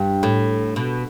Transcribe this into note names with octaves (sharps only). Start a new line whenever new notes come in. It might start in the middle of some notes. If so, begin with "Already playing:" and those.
Already playing: G2
A2
B2